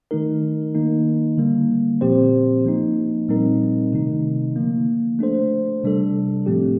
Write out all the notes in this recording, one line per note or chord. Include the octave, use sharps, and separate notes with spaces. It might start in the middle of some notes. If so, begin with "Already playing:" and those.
D#3 A3 D#4 A#4
D#3 A#3 D#4
D3 G3 A#3
A#2 F3 C4 G4 C5
F3 A#3 D#4
A#2 G3 C4 D#4 A#4
C3 D#3 A3 D#4
D3 F3 A#3
A3 D4 A4 C5
C3 G3 D4 A4
A2 F3 A3 C4 G4